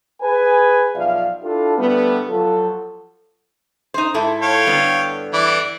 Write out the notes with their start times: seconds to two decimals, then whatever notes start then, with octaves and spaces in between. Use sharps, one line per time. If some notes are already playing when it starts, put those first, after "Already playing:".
0.21 G#4 B4 G#5
0.94 B1 B2 F3 D5 E5 F5
1.43 D4 E4 F4 G4 A4
1.77 D3 G3 A3 B3
2.27 F3 F#3 F4 F#4 A4
3.94 D#4 C5
4.14 G#2 E4 A4
4.42 C#5 F5 G5
4.66 G2 D3 B3
5.33 E3 D5